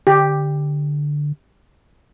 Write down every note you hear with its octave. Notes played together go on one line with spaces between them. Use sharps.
D3 G4